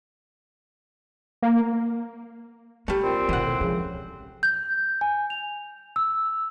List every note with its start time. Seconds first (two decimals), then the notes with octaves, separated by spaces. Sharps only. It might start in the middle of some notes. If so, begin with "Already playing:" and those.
1.43 A#3
2.88 G3 A3 D4
3.03 A#2 C4
3.29 B1 D#3 E3 F#5
3.45 A2
3.61 C#3 F3 G#3
4.43 G6
5.01 G#5
5.30 F7
5.96 E6